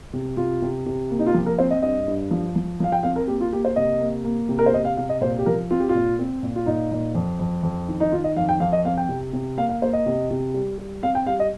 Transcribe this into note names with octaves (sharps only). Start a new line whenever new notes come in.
C3
C3 F4
C3
C3
A#3
D#4
F4
F3 G4
A#4
C4 C5
D#5
G2 D#5
G2
F3
F3
F3 F5
G5
C4 F5
A#4
A#3 G4
F4
A#3 G4
C5
C3 D#5
A#3
A#3
C3
A#4
C5
C3 D#5
F5
C3 F5
D#5
A#2 C5
G4
F3 A#4
C4 F4
G4
F4
A#2
C4
A#2
F4
A#2 D#4
A#2
F2
F2
F2
D#3
D#4
D#3 F4
D#5
F2 F5
G5
F2 F5
D#5
C4 F5
G5
C3
C3
A#3 F5
F5
A#3 C5
D#5
C3
C3
G3
G3
C4 F5
G5
G3 F5
D#5